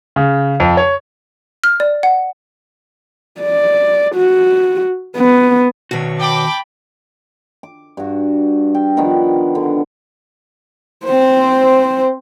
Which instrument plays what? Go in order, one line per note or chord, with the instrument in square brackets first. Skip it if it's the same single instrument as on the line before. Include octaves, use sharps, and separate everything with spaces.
[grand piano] C#3
F2
C#5
[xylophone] F6
D5
F#5
[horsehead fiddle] D5
F#4
B3
[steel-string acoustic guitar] B2 C#5 [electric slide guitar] D#3 F#4
[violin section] G5 A5 B5 [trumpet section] D6
[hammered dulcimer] D6
G2 F#4
G5
D#3 F3 B3 D4
D3
[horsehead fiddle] C4 C5